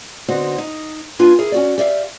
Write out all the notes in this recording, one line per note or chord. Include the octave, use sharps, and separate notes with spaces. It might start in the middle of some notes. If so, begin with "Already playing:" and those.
D3 B3 C4 D#4 F#4
D#4
A#3 D4 F4 B4 G#5
E4 G#4 A#4
C#4 F#4 D5
G4 D5 E5 F5